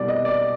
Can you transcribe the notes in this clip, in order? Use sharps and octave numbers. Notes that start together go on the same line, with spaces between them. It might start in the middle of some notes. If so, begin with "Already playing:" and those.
Already playing: C2 B2 G3 D5
D#5
D5